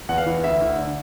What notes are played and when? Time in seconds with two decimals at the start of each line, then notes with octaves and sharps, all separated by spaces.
0.09 E2 F#5
0.18 F5
0.26 E3
0.44 D2 E5
0.61 D2
0.78 D3